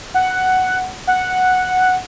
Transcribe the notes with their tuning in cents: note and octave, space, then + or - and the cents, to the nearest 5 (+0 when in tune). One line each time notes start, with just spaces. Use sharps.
F#5 +5
F#5 -5